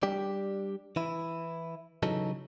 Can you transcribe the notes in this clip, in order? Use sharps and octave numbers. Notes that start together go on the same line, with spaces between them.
G3 D4 G4 D5
E3 E4
C#3 E3 F#3 C#4 D#4 A4